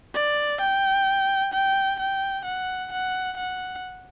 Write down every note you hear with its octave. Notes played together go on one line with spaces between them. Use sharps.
D5
G5
G5
G5
F#5
F#5
F#5